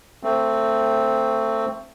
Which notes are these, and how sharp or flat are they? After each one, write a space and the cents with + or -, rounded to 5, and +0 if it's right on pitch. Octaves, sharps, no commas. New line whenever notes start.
A3 +25 C4 +0